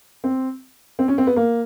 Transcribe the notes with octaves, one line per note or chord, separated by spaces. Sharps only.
C4
C4
C#4
C4
B3
A#3